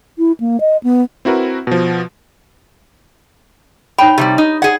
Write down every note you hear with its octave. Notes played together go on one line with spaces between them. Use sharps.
E4
A#3
D#5
B3
C4 E4 F#4 A#4 B4
B2 F3
D#4 C#5 G5 B5
C3 F3 G3 G4
D#4 D#6
G#4 D5 F#5